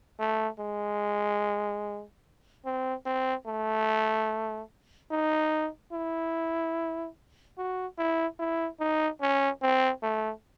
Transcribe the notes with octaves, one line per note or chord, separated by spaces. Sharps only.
A3
G#3
C4
C4
A3
D#4
E4
F#4
E4
E4
D#4
C#4
C4
A3